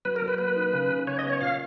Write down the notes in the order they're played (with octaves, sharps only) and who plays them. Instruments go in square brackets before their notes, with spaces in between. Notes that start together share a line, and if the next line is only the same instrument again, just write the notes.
[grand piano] F#3 [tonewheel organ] B4
[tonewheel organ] A#4
[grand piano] F#3
[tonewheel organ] B4
[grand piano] A#3 [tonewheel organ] B4
[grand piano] D#4
C#3
C#3
[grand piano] C#3 [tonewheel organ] C#5
[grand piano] B3 [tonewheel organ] D#5
[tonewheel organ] C#5
[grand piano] A#2 [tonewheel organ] F5